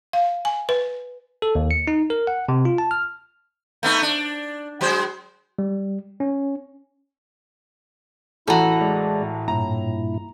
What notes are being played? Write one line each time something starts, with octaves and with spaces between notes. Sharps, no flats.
F5
G#5
B4
A4
D#2
C#7
D#4
A#4
F#5
C3
F4
A5
F6
A3 B3 D#4
D4
F#3 G#3 C5
G3
C#4
A1 E3 E4 F#4 A4 A#5
G#3 D5
A2
G2 A#2 E4 A#5